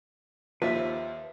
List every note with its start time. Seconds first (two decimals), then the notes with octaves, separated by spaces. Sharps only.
0.62 D#2 F3 B4 E5